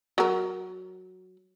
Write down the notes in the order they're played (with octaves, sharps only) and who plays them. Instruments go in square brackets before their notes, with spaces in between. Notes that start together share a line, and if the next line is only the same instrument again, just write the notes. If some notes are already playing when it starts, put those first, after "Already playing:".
[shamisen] F#3 A#4